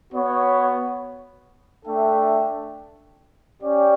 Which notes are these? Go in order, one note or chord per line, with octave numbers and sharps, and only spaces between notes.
B3 F#4 C#5
A3 D4 A4 E5 G5
C#4 G4 D5 G5